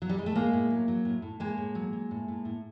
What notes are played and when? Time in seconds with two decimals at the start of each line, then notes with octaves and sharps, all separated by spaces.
0.02 F#3
0.09 G3
0.19 G#3
0.26 A3
0.35 A2 G#3 A#3
0.53 A2
0.70 F#3
0.88 F#3
1.05 A2
1.22 A2
1.40 A2 G#3 A#3
1.58 A2
1.75 F#3
1.93 F#3
2.11 A2
2.28 A2
2.45 A2